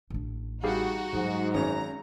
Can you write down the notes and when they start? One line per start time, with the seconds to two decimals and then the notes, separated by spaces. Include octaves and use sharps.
0.10 A1 D4
0.64 G3 D#4 F#4 G#4 F5
1.13 G#2 F#3
1.54 G#1 F#2 C#4 A#5